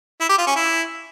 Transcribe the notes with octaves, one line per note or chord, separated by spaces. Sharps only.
E4
G4
F4
C#4
E4